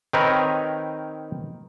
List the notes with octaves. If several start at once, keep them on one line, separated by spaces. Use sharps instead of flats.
D#3 C4 D#4 A#4 B4 C#5